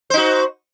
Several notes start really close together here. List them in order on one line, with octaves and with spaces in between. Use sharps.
C5 D#4 F#4